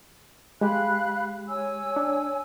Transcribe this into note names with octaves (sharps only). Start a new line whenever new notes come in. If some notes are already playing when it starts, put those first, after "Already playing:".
G#3 G4 F5 B5 F#6
C#5 G#5 E6
D4